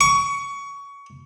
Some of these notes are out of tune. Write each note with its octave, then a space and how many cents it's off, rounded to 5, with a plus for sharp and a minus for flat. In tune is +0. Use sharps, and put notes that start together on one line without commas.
C#6 +20